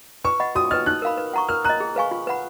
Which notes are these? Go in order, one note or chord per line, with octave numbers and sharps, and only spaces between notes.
B4 C#6
D#5 F#5 B5
F#4 D#6
B4 D#5 F6
D#4 F#6
A#4 F5 B5
B4
F#5 A#5 C#6
A#4 F6
D#5 A#5 F#6
G#4
B4 F5 G#5 C#6
F4
B4 F#5 B5